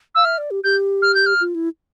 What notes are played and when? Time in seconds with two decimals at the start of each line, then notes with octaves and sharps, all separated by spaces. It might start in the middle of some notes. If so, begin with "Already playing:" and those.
0.14 F5 E6
0.25 E5 F6
0.38 D5
0.51 G4
0.64 G4 G6
1.02 F6
1.14 G6
1.26 F6
1.41 F4
1.55 E4